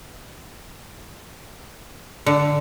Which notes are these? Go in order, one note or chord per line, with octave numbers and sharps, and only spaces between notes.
D3